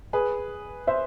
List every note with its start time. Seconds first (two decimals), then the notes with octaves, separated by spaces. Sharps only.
0.13 G#4 B4
0.87 C5 E5